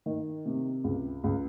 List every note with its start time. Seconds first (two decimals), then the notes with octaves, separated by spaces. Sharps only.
0.06 D#3
0.46 C3
0.84 C#2
1.24 C#2